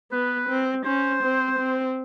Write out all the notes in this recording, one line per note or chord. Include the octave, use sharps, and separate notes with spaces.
B3 B4
C4
C#4 C5
C4
C4